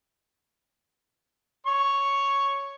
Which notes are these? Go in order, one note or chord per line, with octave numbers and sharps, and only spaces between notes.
C#5 C#6